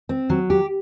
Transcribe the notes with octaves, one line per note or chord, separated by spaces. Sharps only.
C4
F#3
G4